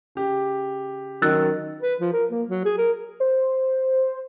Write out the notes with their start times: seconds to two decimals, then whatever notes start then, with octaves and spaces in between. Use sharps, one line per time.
0.15 C#3 G4
1.22 D#3 F#3 C#4 E6 F#6 A6
1.82 B4
2.01 F3
2.13 A#4
2.30 A#3
2.48 F#3
2.65 G#4
2.78 A#4
3.20 C5